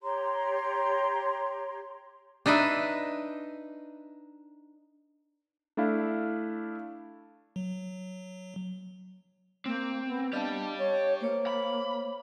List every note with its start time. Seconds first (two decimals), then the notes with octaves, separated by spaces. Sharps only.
0.02 G4 C#5 A#5 C6
2.46 D4 D#4 B4 D#5 E5
5.77 A3 D4 E4 F5
7.56 F#3
9.66 A#3 C4
10.06 B3
10.33 D4 G4 D5 D#5 F5 A5
10.78 C#5
11.20 A#3 C5 C#5
11.47 B5